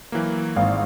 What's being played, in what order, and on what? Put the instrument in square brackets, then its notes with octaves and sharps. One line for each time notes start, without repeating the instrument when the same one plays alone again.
[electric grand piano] E3 F#3 A#3
[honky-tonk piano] G#1 F5